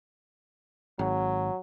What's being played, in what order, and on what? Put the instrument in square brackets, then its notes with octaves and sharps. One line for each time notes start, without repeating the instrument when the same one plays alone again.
[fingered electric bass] G#1 [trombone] F#3